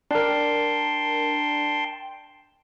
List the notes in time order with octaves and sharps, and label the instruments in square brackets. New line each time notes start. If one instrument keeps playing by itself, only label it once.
[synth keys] D4 A#4 [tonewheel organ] G5 A5 C6